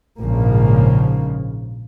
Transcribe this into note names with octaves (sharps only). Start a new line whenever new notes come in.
A#1 G#2 C#3 F3 A#3